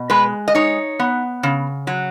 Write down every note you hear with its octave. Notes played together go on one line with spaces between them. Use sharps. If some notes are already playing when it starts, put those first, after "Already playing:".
Already playing: B2
G#3 B4
D#5
D#4 C#5
B3
C#3
F#3